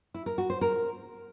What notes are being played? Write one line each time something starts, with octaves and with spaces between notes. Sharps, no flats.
E4
A#4
F#4
C5
A#4